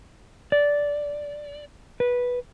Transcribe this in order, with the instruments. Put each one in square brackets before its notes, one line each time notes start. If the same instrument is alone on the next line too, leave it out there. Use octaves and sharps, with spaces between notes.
[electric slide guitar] D5
B4